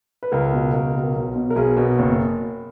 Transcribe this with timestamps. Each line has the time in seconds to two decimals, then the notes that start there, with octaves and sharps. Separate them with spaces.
0.23 B4
0.32 C#2 A#4
0.52 B2
0.73 C#2 A#4
0.94 B2
1.15 B1
1.35 B2
1.50 A#4
1.56 B1 G#4
1.77 B2
1.98 F#1